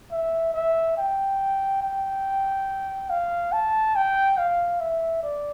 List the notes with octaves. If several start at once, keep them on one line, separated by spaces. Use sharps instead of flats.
E5
E5
G5
G5
F5
A5
G5
F5
E5
D5